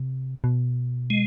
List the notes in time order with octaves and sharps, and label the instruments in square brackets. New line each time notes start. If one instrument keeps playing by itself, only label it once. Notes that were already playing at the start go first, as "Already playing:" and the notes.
Already playing: [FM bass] C3
B2
[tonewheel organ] G#3